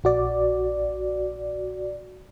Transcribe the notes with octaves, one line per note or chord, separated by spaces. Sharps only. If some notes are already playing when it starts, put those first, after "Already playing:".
A#1 F#4 D5